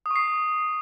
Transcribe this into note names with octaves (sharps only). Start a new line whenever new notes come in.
D#6
C#6
C7